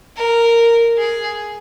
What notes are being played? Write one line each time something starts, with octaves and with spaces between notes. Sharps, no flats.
A#4
G#4